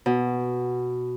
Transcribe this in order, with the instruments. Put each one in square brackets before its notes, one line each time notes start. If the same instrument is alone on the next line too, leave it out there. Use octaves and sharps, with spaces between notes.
[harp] B2